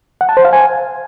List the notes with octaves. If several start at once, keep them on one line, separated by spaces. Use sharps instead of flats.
F#5
A5
C5
F5
G#5